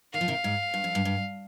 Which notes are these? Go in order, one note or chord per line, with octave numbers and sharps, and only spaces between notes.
D#3 F5
F3
C3 D#3
G#2
G2
F2
G2
G2